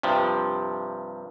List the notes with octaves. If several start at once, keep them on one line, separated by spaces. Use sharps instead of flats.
G2 C3 F3